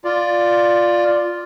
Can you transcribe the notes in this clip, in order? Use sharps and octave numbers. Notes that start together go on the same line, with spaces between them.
F4 D5